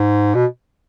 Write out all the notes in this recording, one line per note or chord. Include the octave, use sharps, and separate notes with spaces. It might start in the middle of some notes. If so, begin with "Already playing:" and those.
Already playing: G#2
B2